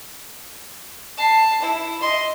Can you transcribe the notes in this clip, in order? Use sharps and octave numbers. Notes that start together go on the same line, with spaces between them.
A5 C7
E4
D#5 C6